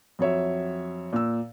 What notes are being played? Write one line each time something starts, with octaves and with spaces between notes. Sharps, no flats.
F2 F#3 C#5 E5
A#2 E6